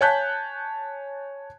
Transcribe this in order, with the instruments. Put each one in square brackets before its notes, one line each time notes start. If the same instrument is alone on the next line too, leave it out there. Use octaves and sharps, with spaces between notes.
[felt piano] C#5 G#5 A5 F#6 G6 B6